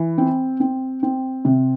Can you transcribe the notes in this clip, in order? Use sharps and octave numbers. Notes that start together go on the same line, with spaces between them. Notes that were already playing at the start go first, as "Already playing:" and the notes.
Already playing: E3
C4
C4
C4
C3